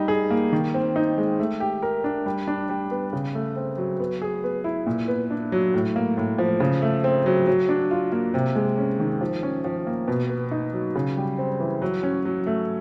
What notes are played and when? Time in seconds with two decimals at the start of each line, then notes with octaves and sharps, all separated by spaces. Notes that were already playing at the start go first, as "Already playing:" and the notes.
Already playing: G3 D#4
0.08 G#4
0.31 A#3
0.53 D#3
0.74 C4
0.96 D#4
1.18 G#3
1.40 A3
1.60 G4
1.83 A#4
2.04 D4
2.26 G3
2.48 D4
2.69 G3
2.91 B3
3.13 C#3
3.35 A3
3.56 C4
3.78 F#3
4.00 B3
4.22 G#4
4.44 B3
4.64 E4
4.86 A#2
5.08 B3
5.30 D4
5.52 F#3
5.74 A2
5.96 A#3
6.18 A2
6.38 F3
6.60 C#3
6.82 A3
7.04 C4
7.26 F#3
7.47 F#3
7.69 D4
7.91 F4
8.12 A#3
8.34 C3
8.55 G#3
8.78 C#4
9.00 D#3
9.21 F3
9.43 C#4
9.64 F3
9.87 A#3
10.08 B2
10.29 B3
10.51 D#4
10.73 F#3
10.95 C#3
11.17 G3
11.38 C4
11.60 E3
11.82 F#3
12.03 C#4
12.25 F#3
12.47 A3